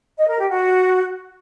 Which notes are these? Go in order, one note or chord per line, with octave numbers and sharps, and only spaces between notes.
D#5
A#4
G4
F#4